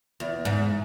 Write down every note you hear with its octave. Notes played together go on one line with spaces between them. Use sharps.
E2
G#2